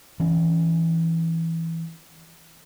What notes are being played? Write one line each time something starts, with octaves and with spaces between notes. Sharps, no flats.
E3 C#4